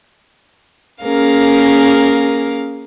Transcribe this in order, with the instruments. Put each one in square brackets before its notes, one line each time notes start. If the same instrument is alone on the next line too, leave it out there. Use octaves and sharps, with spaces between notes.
[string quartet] A#3 C#4 G#4 A#4 F5